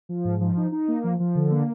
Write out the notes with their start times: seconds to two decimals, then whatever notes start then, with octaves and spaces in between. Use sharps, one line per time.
0.09 F3
0.25 G#2
0.40 F3
0.57 D#4
0.72 D#4
0.88 A#3
1.04 F3
1.20 F3
1.35 D3
1.51 A#3